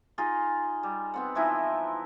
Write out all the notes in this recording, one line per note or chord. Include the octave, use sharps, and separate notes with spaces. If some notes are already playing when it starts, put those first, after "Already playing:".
D#4 F4 G#4
G3
B3 C4 F#5
E3 F3 D#4 E4